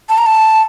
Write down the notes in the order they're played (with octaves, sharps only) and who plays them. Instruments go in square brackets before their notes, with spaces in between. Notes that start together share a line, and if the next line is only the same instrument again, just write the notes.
[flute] A5
A#5
A5